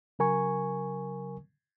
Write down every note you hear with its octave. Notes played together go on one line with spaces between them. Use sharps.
C#3 F#3 A#4 G#5 C#6